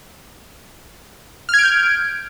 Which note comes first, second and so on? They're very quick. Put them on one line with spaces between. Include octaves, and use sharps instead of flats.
F6 G#6 D7 G6